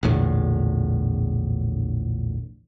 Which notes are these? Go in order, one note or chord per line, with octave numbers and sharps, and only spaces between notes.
A#1 E2 A2 D3